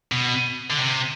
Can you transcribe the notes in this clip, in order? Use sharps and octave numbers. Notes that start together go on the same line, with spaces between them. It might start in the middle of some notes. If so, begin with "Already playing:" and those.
B2
D3
C3